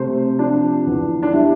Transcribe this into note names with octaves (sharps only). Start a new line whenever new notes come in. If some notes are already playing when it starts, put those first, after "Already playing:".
Already playing: C3 A3 C5
F3 D4
E2
D4
G3 E4